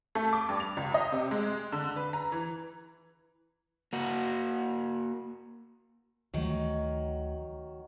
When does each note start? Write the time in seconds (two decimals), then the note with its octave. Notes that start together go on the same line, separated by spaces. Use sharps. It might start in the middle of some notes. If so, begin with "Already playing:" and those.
0.15 A3
0.33 D6
0.49 G2
0.60 F7
0.77 C#2
0.94 D#5
1.12 C3
1.31 G#3
1.72 D3
1.96 B4
2.13 A#5
2.32 E3
3.93 A#3 F#4
6.34 D2 D#3 F3 F#3 A3